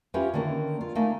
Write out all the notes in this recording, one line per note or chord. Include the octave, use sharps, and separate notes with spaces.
C#4 E4 F4 G4 B4
D3 D#3 A#3 C#4
F4
A3 A#3 D#4 F5 G#5